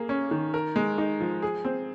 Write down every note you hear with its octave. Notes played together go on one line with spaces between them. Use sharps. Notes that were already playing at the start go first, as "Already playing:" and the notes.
Already playing: A#3 G#4
C#4
D#3
A#4
G#3
D#4
F3
G#4
C4